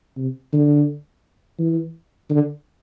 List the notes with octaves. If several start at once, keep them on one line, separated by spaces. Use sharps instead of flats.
C3
D3
E3
D3